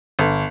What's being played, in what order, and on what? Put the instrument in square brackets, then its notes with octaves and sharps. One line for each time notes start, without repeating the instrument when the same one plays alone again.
[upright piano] G1